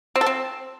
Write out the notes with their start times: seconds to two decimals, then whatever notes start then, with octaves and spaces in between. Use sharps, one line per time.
0.16 C4
0.21 A4
0.26 C4